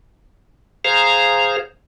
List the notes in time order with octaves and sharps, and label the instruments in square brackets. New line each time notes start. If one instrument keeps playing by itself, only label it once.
[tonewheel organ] G#4 C5 F5 A#5